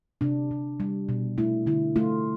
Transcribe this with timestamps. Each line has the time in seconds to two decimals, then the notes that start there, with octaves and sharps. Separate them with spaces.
0.21 C3 D4
0.51 C3
0.80 G3
1.09 B2
1.38 A3 E4
1.66 D3 E4
1.96 A3 F4